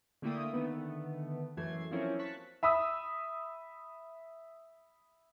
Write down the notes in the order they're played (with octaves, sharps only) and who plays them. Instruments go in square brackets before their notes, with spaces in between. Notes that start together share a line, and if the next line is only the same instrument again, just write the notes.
[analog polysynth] D3 A3 A#3 E4 G5 D#6
D3 D#3 A3 B3
F#2 E3 A3 G#6 C7
F3 F#3 A#3 C4 C#4 E4
A5 C#6 F#6 B6
[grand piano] E5 B5 D#6 E6